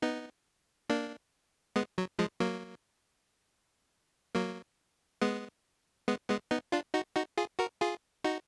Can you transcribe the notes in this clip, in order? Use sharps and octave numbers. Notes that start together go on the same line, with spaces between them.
B3 D#4
A#3 D4
G#3 B3
F#3
F3 G#3
F#3 A#3
F#3 A#3
G#3 B3
G#3 B3
G#3 B3
B3 D#4
D4 F4
D#4 F#4
D#4 F#4
F4 G#4
F#4 A#4
F4 G#4
D#4 F#4